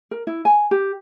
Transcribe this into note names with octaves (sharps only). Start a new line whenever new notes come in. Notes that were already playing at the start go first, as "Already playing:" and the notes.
A#4
E4
G#5
G4